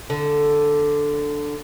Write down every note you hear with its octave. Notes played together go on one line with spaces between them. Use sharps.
D3